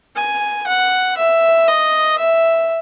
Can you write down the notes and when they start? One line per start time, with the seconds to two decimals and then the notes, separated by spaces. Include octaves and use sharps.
0.16 G#5
0.67 F#5
1.17 E5
1.68 D#5
2.18 E5